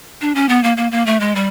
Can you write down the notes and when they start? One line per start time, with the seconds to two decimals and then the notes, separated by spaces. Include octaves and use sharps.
0.21 D4
0.35 C#4
0.49 B3
0.64 A#3
0.77 A#3
0.92 A#3
1.06 A3
1.20 G#3
1.35 G3